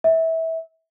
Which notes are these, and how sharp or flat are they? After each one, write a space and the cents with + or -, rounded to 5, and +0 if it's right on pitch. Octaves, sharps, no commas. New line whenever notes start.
E5 -20